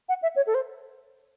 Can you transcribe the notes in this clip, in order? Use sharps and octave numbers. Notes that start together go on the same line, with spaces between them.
F#5
E5
C#5
A4
C5